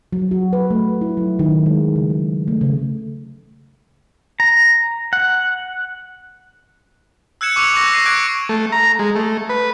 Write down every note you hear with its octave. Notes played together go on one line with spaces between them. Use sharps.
F#3
F#4
B4
A3
E4
F#3
D#3
G#3
C#3
F#3
A3
C#3
A#5
F#5
E6 F#6 G#6 C#7 E7
C#6 D6 E6 C#7 D#7 F7
C#6 D6 F#6 A#6
A#6 C7 D#7
D6 F#6 G#6 D7
A3
A#5
G#3
A3
B4